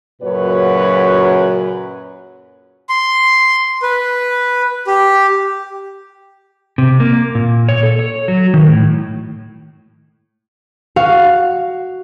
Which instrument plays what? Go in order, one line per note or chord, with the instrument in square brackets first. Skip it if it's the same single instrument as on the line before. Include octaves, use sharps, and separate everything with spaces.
[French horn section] F#2 A#2 C#3 F#4 B4 C#5
[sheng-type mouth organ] C6
B4
G4
[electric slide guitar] C3
A#3
A#2
C#5
A4
C#5
F#3
D#3
A2
[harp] F#4 F5